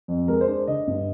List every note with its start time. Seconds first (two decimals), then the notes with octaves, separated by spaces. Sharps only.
0.08 F2
0.28 G#3 A#4
0.41 C5
0.47 D4
0.67 D3 D#5
0.87 G2